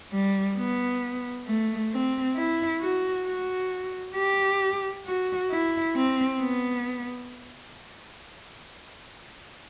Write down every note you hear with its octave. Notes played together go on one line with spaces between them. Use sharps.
G3
B3
A3
C4
E4
F#4
F#4
G4
F#4
E4
C4
B3